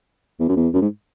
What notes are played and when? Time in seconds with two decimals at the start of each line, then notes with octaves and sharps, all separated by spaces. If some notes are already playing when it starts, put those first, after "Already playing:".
0.40 E2
0.49 F#2
0.57 E2
0.74 F#2
0.82 G#2